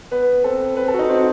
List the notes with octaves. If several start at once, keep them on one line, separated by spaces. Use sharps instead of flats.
B3 B4
C4 A4
C4 B4
A4
F#4
D#4
C4 F#4